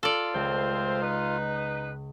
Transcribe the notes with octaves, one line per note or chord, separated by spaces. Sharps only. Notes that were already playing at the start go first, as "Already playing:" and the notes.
F4 A4 D5
C#2 A3 C4 C5
D#4 B4